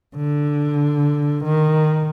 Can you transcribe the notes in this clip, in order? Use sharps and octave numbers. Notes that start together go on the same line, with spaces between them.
D3
D#3